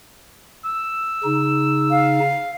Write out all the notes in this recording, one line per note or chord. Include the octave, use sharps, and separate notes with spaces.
E6
C#3 D#4
F5